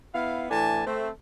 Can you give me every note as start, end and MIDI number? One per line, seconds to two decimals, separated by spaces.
0.14 0.45 59
0.14 0.45 64
0.14 0.45 77
0.50 0.86 45
0.50 0.86 52
0.50 0.86 62
0.50 0.86 80
0.50 0.86 81
0.86 1.09 57
0.86 1.09 60